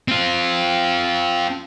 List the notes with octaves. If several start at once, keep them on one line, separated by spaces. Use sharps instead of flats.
C4 F4